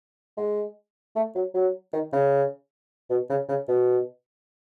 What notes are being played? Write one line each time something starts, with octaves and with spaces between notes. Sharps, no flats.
G#3
A3
F#3
F#3
D#3
C#3
B2
C#3
C#3
B2